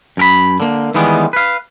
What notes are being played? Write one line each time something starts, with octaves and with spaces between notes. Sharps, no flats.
F#2 A#4 B5
D3 A#3
D#3 E3 G3 G#3 B3
B4 F5